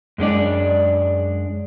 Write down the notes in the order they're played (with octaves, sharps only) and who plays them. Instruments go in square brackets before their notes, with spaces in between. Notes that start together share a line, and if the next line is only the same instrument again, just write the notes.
[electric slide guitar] F#2 G#3 D4 D5